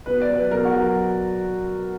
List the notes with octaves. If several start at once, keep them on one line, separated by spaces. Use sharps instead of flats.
B2 B4
D5
F#3
B4
B2 A#4
F#4
F#3
A#4